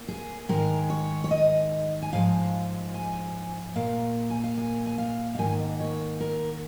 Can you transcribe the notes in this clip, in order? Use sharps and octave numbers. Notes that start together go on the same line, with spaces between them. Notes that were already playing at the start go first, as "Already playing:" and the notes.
Already playing: A#3
G#4
G#2 D#3 G#3 A#4
C#5
C#5
D#5
G#5
G#2 F3 G#3 F5
G#5
A#2 A#3 F5
G#5
F5
G#5
G#5
F5
F5
G#2 D#3 A#3 G#5
D#5
C#5
A#4